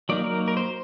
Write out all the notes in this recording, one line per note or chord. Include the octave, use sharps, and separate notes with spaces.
F#3 A#3 D#4 D5
A#4
A#4
C5